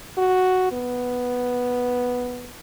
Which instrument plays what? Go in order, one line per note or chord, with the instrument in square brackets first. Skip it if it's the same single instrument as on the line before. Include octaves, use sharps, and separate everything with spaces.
[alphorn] F#4
B3